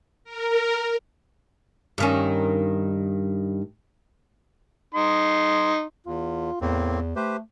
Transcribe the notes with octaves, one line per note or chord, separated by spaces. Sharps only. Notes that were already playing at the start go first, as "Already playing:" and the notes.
A#4
G2 D#3 C#4
D#4 C6
E2 F4
E2 A2 A#3 C4
A3 G4 B4 C5